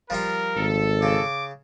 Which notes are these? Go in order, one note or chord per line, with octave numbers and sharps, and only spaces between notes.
F3 G3 F4 A#4
G#1 A4
C#3 D6